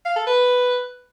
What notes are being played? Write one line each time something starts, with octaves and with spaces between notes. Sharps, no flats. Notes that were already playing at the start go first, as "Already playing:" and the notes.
F5
A4
B4